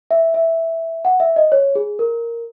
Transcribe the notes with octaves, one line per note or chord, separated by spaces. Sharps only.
E5
E5
F#5
E5
D#5
C#5
G#4
A#4